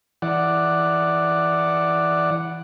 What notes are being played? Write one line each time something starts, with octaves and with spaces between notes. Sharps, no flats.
E3 D5 F#5